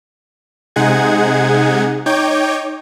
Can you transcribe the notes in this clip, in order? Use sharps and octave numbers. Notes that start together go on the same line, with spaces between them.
C3 G#3 D#4 G#4 F#5 G#6
D#4 C#5 G5 D6 G6 G#6